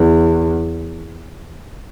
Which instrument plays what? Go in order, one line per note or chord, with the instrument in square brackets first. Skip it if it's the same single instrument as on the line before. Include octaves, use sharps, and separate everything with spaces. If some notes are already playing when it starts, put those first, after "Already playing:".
Already playing: [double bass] E2